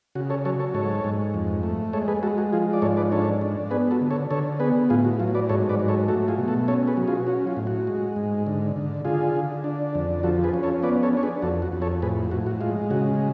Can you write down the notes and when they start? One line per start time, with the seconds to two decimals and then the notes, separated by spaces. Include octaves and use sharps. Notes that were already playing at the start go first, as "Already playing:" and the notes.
0.15 C#3 F#4
0.30 A4 C#5
0.45 F#3 A4 C#5
0.60 A4 C#5
0.74 G#2 A4 C#5
1.04 G#2
1.34 F2
1.63 A3
1.93 G#3 A4 C#5
2.08 G#4 B4
2.23 G#3 F#4 A4
2.38 F#4
2.53 F3 F4 G#4
2.73 D5
2.82 G#2 A4 C#5
2.97 B4 D5
3.12 D4 A4 C#5
3.41 D4
3.71 B3 G#4 B4
3.91 F#4 A4
4.01 D3
4.10 A4 C#5
4.30 D3 A4 C#5
4.60 B3 G#4 B4
4.90 A2 F4 G#4
5.05 F#4
5.20 F#3 F4
5.35 B4 D5
5.49 G#2 A4 C#5
5.69 B4 D5
5.80 F#3
5.88 A4 C#5
6.08 A3 F#4 A4
6.28 F4 G#4
6.38 B2
6.48 F#4 A4
6.68 C#4 A4 C#5
6.88 G#4 B4
6.97 F#3
7.08 F4 G#4
7.27 C#4 F#4
7.47 F4
7.57 A2
7.67 F#4
7.87 G#3
8.16 G#2
8.46 D3
8.76 D3
9.05 D3 F4 G#4
9.35 D3
9.64 D4
9.95 F2
10.23 F3 F#4 A4
10.43 G#4 B4
10.54 C#4
10.63 A4 C#5
10.83 B3 B4 D5
11.03 A4 C#5
11.13 D4 C#5
11.23 G#4 B4
11.42 F2 F#4 A4
11.62 F#4
11.72 F2
11.82 A4 C#5
12.02 A2 G#4 B4
12.31 A2 F#4
12.46 F#4
12.61 G#3 F4
12.90 C#3 F#4